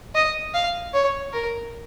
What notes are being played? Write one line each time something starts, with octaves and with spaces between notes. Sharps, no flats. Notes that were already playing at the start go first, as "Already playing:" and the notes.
D#5
F5
C#5
A#4